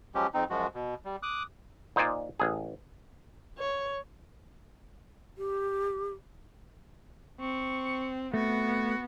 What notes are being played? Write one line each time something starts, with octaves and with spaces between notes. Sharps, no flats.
F3 F#3 G#3 C#4 G4
F2 C4 D#4
F#2 F3 G#3 F#4
B2
G3
D6 D#6 F#6
A#2 D#4 C5 D5 G#5
A1 G#4
C#5
G4
C4 C#6
A3 B3 F#4